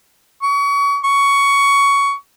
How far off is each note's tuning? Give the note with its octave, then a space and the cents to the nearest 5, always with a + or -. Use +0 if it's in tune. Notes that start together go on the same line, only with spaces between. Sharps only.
C#6 +30
C#6 +15